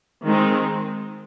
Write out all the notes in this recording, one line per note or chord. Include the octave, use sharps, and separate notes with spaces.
D#3 G#3 C4